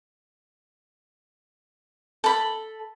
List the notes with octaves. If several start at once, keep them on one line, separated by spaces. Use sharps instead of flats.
A4 B5